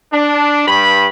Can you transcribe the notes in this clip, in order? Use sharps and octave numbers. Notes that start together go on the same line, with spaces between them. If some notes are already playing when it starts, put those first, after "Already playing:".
D4
G2 B5